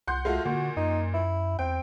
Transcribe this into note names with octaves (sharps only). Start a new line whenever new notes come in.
C2 F#5 C6 G6
G#3 A3 F4 F#4
A#2 D3 F#4
F#2 D#4
E4
E2 C4 G5